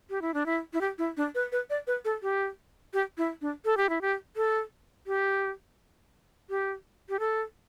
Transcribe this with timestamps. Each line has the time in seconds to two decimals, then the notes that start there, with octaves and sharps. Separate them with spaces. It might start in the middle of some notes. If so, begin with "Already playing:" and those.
0.10 G4
0.22 E4
0.34 D4
0.46 E4
0.73 E4
0.81 G4
0.98 E4
1.17 D4
1.35 B4
1.52 B4
1.70 D5
1.87 B4
2.05 A4
2.22 G4
2.94 G4
3.18 E4
3.42 D4
3.65 A4
3.77 G4
3.89 E4
4.01 G4
4.36 A4
5.07 G4
6.50 G4
7.09 G4
7.20 A4